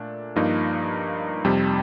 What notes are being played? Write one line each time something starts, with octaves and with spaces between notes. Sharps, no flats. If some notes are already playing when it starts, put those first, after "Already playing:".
Already playing: A#2 A3 D4
G2 F3 A#3 D#4
F2 C3 G3